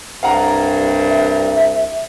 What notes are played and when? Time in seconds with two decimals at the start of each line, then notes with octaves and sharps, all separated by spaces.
0.23 C2 G2 F5 F#5 A#5
1.08 E5